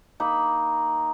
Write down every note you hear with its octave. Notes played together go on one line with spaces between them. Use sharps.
A#3 D#4 B5